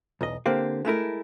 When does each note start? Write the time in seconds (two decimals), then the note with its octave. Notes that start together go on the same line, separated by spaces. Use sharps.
0.21 B1 E2 D#5
0.46 D3 A#3 C4 G4
0.85 G#3 A3 E4 A#4